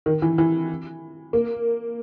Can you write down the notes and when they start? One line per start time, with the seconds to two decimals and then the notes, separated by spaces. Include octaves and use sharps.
0.06 D#3
0.22 E3
0.38 E3
1.33 A#3